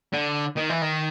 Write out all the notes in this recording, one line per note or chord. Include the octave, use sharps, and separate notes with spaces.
D3
D#3
E3
D#3